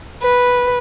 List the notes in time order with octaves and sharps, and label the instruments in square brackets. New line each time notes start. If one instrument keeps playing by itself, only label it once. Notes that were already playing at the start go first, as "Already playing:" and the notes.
[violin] B4